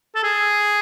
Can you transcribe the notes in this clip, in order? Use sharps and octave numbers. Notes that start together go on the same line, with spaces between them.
A4
G#4